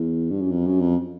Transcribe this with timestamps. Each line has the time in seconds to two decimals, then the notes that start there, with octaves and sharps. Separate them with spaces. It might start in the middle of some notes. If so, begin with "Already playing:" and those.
Already playing: E2
0.31 G2
0.41 F#2
0.51 F2
0.67 F#2
0.81 F2